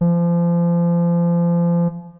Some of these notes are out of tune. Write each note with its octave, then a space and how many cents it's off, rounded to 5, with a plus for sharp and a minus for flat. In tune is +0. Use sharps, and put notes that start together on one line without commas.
F3 -30